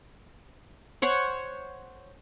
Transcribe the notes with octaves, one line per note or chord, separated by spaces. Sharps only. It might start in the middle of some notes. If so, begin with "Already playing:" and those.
C5 C#5 F#5